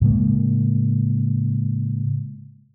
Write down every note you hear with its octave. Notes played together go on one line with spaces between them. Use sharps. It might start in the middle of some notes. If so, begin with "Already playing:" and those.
A2 C#3 G#3 A#3